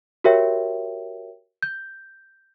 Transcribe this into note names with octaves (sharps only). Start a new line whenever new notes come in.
F#4 G4 A#4 C#5 E5 G5
G6